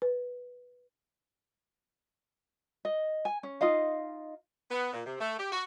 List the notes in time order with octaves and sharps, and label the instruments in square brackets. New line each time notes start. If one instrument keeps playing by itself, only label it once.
[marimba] B4
[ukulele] D#5
G#5
C#4
D#4 F4 D#5 F5
[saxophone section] B3
A#2
C3
A3
G4
F#4